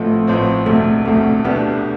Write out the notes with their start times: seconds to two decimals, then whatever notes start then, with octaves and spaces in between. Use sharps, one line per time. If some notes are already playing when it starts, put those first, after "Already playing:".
Already playing: A1 A2 F3 A3 C4
0.27 A1 A2 F3 C4
0.66 E1 D2 C3 A3
1.05 E1 D2 C3 A3
1.44 C2 B2 A3 B3 D4 G4